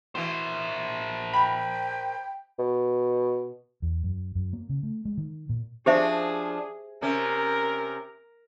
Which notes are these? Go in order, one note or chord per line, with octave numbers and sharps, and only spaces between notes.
B2 E3 A#4 C5
G5 B5
B2
E2
F#2
F#2
A#3
C#3
A3
G#3
D#3
A#2
F3 D4 G4 G#4 C5 E5
C3 C#4 A#4